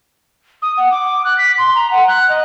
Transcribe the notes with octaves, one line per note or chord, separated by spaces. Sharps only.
D#6
F#5
D6
F#6
B6
C6
A#5
F#5
F#6
D#5